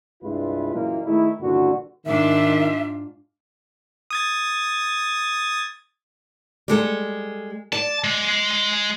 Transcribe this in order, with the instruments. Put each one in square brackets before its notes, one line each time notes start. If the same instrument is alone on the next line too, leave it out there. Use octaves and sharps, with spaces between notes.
[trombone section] C2 G2 G#3 E4 F4 B4
F#2 A#2 E3 G#3 A#3
D#3 G#3 A3 D#4 E4
C#2 G2 A#2 D3 E3 F#4
[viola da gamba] G#2 D4 F4 [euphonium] D#3 [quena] E5
[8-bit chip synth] D#6 G#6 A6
[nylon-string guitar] G3 G#3 A4
[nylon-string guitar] D5 [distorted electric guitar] A5
[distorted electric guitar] G#3